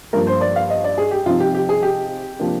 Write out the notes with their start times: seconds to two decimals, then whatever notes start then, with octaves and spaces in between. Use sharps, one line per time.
0.13 G2 F3 A#3 A#4
0.27 C5
0.41 D5
0.56 F5
0.70 D#5
0.84 D5
0.98 G#4
1.11 G4
1.26 C3 F3 C4 D#4 F4
1.40 G4
1.54 G4
1.69 G#4
1.82 G4
2.39 C3 F3 A#3 D4